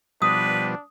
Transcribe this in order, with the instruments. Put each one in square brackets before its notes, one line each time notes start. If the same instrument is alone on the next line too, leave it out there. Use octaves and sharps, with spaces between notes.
[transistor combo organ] B2 F3 G3 [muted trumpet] D4 [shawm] B4 [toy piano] D#6